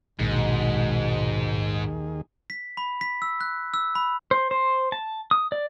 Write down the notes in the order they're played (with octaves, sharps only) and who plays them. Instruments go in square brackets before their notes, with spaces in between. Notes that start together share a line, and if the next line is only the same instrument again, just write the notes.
[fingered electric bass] A#1 [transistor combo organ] D#2 D#3 G#4 [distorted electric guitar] G#2 [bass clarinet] B2
[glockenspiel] B6
B5
B6
E6
F#6
E6
B5
[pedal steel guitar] C5
C5
A5
D#6
D5